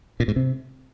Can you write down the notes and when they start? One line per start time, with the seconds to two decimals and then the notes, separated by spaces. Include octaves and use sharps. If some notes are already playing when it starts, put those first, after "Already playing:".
0.20 A#2
0.28 G#2
0.36 C3